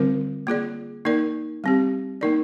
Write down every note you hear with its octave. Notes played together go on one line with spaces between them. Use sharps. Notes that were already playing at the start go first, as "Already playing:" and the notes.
Already playing: D3 G3 C4 F4 A#4
A#3 F4 G#4 D5
A#3 D#4 A#4 D5
G3 C4 G4
A#3 D#4 A#4 D5